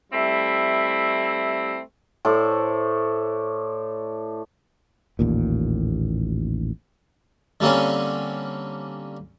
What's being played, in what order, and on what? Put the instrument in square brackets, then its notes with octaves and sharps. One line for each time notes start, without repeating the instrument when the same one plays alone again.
[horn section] G3 A3 C4 E4
[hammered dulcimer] A2 A3 C5 D5
[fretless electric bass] A1 D#2 A#2
[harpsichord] D3 G3 A#3 C4 C#4